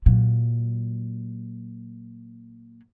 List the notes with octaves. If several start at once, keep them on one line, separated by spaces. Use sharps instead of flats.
A#2 F#3